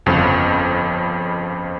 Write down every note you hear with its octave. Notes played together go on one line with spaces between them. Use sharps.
G1 F2 C#3 F3